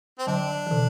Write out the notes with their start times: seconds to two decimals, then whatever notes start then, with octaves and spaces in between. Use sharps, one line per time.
0.19 C4
0.27 D3 F#3 D4
0.67 E3
0.71 B2 D3